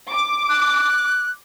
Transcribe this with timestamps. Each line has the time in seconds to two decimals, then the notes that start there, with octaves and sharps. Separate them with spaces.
0.11 D6
0.49 F#6